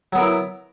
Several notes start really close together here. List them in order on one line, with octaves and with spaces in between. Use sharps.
F#3 B3 A#4 E4